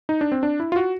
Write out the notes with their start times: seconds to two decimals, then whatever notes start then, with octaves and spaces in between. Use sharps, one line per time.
0.09 D#4
0.21 D4
0.32 C4
0.43 D4
0.60 E4
0.72 F4
0.76 F#4